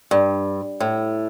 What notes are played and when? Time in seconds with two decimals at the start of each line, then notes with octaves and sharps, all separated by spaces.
0.11 G2
0.80 A2